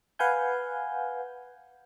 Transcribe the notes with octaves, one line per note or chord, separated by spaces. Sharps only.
B4 F5 F#5 G#5 G6